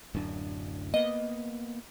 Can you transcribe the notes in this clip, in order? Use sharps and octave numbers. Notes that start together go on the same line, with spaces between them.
D1 F#2 D4
A#3 B3 D#5